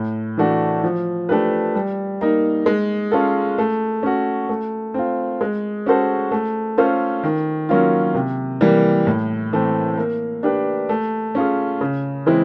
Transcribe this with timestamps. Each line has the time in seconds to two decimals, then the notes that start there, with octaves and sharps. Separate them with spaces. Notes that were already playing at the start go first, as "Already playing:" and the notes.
Already playing: A2
0.37 E3 A3 D4 F#4
0.83 F3
1.29 A3 D4 G4 B4
1.75 G3
2.21 A#3 D#4
2.66 G#3
3.11 C#4 F4 A4
3.58 A3
4.03 C#4 F#4
4.49 A3
4.94 C4 F4
5.41 G#3
5.86 C#4 F#4 A4 C5
6.31 A3
6.78 C#4 F4 A4 C5
7.23 D#3
7.69 F#3 A#3 C#4 F4
8.14 C3
8.61 E3 G3 A#3
9.07 A2
9.53 E3 A3 C4
9.97 A#3
10.43 D4 G4 B4
10.89 A3
11.35 C#4 F4 G#4
11.81 C#3
12.26 E3 G#3 C4 E4